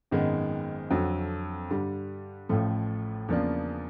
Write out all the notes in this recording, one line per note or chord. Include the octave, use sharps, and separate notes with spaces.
G#1 F#2 D#3 G#3 B3
F2 D3 F#3
G2 D3 G3
A1 A2 F3 A3
E2 C#3 F3 A#3 D4